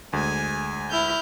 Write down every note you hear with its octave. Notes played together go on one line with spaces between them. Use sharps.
D2 G#3 G#5
E4 F6 G6